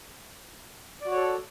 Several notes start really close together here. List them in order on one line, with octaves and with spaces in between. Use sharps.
D5 F#4 C#5 A4